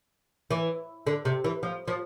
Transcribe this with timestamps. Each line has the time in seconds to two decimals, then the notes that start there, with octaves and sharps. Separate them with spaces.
0.51 E3
1.07 D3
1.25 C3
1.44 E3
1.63 F3
1.88 F3